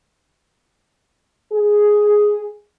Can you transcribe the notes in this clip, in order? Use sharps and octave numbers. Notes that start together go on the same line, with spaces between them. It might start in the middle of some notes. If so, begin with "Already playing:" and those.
G#4